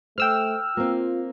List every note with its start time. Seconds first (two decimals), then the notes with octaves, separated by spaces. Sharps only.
0.18 A3 C5 G5 E6 F6
0.77 A#3 C4 F4